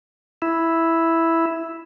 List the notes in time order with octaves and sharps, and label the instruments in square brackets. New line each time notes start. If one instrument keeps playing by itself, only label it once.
[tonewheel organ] E4